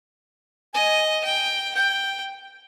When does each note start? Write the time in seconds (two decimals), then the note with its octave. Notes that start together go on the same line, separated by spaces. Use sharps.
0.74 D#5 G#5
1.25 G5
1.75 G5 G6